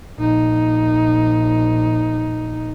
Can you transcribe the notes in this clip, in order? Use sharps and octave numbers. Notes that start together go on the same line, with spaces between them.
A#1 D#4